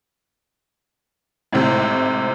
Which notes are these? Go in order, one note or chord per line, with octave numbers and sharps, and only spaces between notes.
G#1 A2 C3